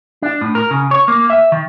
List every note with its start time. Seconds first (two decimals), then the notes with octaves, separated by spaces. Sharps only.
0.22 D4
0.41 A2
0.55 A#4
0.71 C#3
0.91 C#5
1.08 A#3
1.30 E5
1.52 D#3